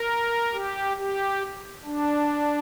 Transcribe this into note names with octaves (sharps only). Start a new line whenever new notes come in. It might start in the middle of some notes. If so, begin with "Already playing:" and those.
Already playing: A#4
G4
G4
D4